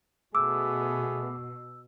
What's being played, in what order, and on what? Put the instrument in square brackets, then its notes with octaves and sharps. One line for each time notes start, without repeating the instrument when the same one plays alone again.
[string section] B2 [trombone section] A3 B3 G#4 [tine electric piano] D6 [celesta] E6